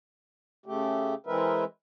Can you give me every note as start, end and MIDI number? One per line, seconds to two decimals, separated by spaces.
0.66 1.15 49
0.66 1.15 57
0.66 1.15 67
1.26 1.64 52
1.26 1.64 56
1.26 1.64 60
1.26 1.64 70
1.26 1.64 71
1.26 1.64 76